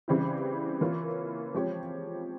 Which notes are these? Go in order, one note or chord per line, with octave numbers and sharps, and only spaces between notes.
C#3 E3 G3 C4 E4
E3 A#3 C#4 F4
F3 G#3 C4 G4 C#5